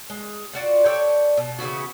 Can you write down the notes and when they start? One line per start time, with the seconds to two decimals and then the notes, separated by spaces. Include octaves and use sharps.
0.10 G#3
0.53 F4 F#4 D5
0.85 A4 C#5 D5 G5
1.37 B2
1.59 C#3 E3 B3 F#4